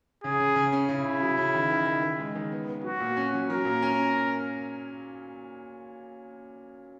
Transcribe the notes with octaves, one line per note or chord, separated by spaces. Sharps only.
C#3 G#4
C#3
C#3
C#4
C#3 E4
C#3
F#3
C#3
D#3
D#3
D#3
D#3
G#3
D#3
B3
B3
F#3 F#4
A#2
C#4
F#3
F#3 A#4
A#2
C#4